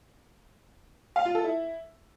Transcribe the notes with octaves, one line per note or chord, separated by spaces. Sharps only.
F5
F4
A4
E4